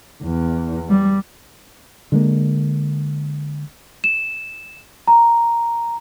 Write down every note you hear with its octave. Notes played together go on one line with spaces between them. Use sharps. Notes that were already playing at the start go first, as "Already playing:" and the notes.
E2
G3
D3 G#3 A#3
E7
A#5